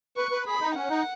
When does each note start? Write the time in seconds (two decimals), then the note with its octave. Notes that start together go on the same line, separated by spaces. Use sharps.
0.17 B4 C#6
0.31 B4
0.46 G#4 B5
0.61 D#4
0.75 C#4 F#5
0.90 D#4